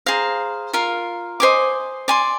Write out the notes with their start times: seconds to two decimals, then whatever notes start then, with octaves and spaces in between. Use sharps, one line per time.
0.06 G#4 C5 F5 A#5
0.73 F4 A#4 F5
1.40 C5 D#5 G#5 D6
2.08 D5 G#5 C6